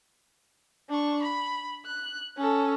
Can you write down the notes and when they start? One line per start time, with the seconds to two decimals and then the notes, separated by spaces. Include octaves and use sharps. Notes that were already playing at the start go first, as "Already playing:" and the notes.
0.89 D4 C#6
1.23 B5
1.86 F#6
2.37 C#4 A4